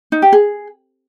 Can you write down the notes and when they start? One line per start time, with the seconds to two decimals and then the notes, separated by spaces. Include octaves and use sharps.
0.12 D#4
0.22 G4
0.33 G#4